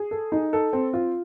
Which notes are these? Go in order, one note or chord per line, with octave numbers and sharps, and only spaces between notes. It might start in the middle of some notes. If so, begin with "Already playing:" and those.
Already playing: G#4
A4
D#4
A4
C4
F4